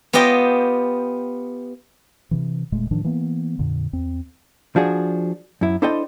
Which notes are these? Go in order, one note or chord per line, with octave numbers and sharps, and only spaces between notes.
B3 F4 G4 D#5 G5
C3 E3
E1 A#2 G#3 A3
A2 D#3 F3 D4
E3 A#3 B3
F2 A#2 D3
E2 C4
F3 D4 F#4 G#4
F#2 E4
D4 E4 A4 C5 D#5 G5